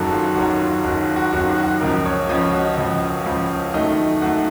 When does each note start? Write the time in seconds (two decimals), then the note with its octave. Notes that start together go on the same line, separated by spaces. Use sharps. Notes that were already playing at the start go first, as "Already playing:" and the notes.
Already playing: F#1 F#2 D#3 F#3 A4
0.12 F4
0.36 F#1 F#2 D#3 F#3 F#4
0.60 F4
0.84 F#1 F#2 D#3 F#3 F#4
1.00 F4
1.16 F#4
1.33 F#1 F#2 D#3 F#3 F#4
1.57 F#4
1.81 C#2 C#3 F3 A#4
2.06 C#5
2.29 C#2 C#3 F3 D#5
2.41 C#5
2.53 F#4
2.65 D#5
2.77 C#2 C#3 F3
3.26 C#2 C#3 F3
3.74 F#2 D#3 A3 D#5
4.22 F#2 D#3 A3 F#5